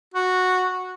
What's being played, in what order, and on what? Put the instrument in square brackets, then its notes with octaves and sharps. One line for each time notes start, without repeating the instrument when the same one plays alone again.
[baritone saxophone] F#4